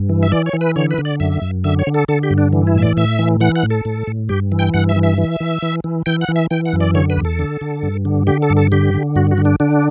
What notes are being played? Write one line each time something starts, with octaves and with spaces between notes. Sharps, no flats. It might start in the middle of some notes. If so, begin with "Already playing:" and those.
Already playing: G2
E3
E5
E3 D5
C#5
E3
B4
D3 C#5
B4
D3
D5
F#2 E5
F#2
D3 E5
C#5
D3
A4
D3 A4
G4
G2
D4
E3
E4
A2 E5
D5
A2 E5
E3
E3 F#5
F#5
A2
A4
A2
A2
G2 G4
E3
G5
G2 F#5
E5
E3
E5
E3
E3
E3
E3
E3 G5
F#5
E3
E5
E3 G5
F#5
F#2
D5
D3 C#5
B4
E2
A4
D3
D3
G2
D3
D3 G4
A4
G2
A4
D3 G4
D3
G2 F#4
F#4
D3
D4
D3 D4